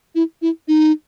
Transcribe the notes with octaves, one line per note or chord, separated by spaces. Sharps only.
E4
E4
D#4